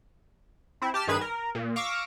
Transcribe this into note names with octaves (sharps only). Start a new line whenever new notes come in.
C4 E4
G4 A5 F6
G2 D#3 G#4 B4 G#6 E7
A#4
A#2
F5 C#6 D6 E6 A#6